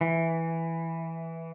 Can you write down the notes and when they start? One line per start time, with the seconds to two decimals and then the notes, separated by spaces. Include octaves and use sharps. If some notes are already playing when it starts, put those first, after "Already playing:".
0.01 E3